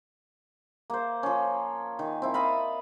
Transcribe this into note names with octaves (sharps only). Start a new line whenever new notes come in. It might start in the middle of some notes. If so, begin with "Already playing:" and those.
A#3 C5
F3 C#4
D#3
C4 E4
D#5 F5 A5 B5